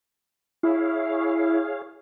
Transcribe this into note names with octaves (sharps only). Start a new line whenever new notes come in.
E4 G#4 C#5 F5